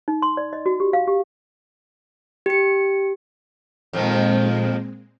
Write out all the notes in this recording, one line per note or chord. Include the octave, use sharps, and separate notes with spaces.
D#4
C6
D5
D#5
F#4
G4
F5
G4
G4 C#7
F2 A#2 D#3 F3 G#3 C4